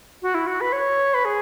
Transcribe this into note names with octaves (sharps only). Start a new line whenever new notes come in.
F#4
E4
F#4
B4
C#5
B4
G#4